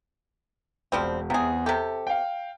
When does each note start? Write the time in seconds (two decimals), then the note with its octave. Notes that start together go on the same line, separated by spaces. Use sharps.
0.92 E1 F3 G3 C4
1.30 E2 C3 G#4
1.66 C3 G4 A4
2.07 F5 G5